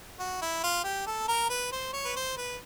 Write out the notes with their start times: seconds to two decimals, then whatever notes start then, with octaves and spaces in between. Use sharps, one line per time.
0.20 F#4
0.42 E4
0.64 F4
0.84 G4
1.07 A4
1.28 A#4
1.50 B4
1.72 C5
1.93 C#5
2.05 B4
2.16 C5
2.37 B4